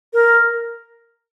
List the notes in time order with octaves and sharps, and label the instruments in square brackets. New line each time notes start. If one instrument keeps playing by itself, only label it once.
[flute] A#4